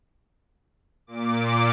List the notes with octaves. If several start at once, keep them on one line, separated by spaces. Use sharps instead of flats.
A#2 D6